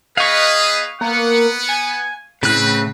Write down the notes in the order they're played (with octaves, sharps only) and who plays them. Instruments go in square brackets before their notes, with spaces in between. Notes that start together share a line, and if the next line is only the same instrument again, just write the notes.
[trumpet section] B3 G#4 B4 [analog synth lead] D#5 [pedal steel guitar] F5 C#6
[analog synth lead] A#3 [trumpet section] B3 F#5
[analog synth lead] G#5
[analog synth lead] A2 [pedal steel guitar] C#3 F#6 [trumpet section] C4 B4